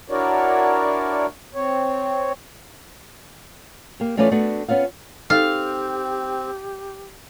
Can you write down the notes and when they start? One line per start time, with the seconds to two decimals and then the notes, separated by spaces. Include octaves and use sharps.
0.10 D4 E4 F#4 A#4 C#5 D5
1.55 C4 C#5
4.00 A#3 G4
4.17 E3 A3 C#4 F4 B4 D5
4.31 A3 B3 D4 F#4
4.68 B3 C#4 F4 F5
5.30 C4 D#4 G4 A4 F5